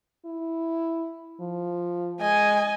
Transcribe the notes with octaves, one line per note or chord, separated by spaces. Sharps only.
E4
F3
G#3 D#5 G#5